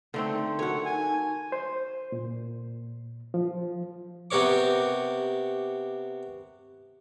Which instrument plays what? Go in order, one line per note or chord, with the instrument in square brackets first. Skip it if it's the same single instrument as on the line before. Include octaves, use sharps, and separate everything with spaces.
[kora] D3 A3 C4 [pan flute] D#4
[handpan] F#4 A4 A#4 [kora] C#5 F#5
[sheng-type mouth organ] G#5
[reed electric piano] C5
A#2
F3
[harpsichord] C3 B3 G4 A#4 C#5 D6